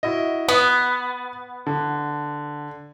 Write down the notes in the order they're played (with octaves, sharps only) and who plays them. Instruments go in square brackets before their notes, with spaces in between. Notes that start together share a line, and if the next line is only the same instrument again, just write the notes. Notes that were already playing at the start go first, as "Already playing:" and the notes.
[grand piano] E4 F#4 D#5
[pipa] B3 [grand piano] D#6
[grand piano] D3